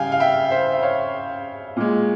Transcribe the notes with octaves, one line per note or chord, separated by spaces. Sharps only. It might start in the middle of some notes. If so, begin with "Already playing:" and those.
Already playing: C#3 G3 F5 G5 G#5
F5
E5 G5
C5 E5
E5
C#5 F5
A#2 G#3